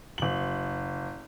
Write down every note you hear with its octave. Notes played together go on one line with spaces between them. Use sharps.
F#1 F#7